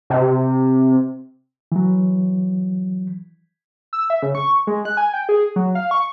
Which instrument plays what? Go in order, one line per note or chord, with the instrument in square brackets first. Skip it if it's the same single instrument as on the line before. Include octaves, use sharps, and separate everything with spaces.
[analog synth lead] C3
[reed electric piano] E3 F#3
[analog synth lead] E6
E5
C#3
C#6
G#3
F#6
G#5
G5
G#4
F#3
F5
C#6